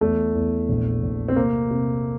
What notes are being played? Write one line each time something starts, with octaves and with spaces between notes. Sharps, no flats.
E2 A3
E2
A#1
A#1
C4
C3 A#3
C3